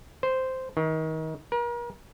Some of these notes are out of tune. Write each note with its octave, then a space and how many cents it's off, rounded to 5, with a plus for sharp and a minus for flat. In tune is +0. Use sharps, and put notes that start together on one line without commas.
C5 -5
D#3 +30
A#4 +40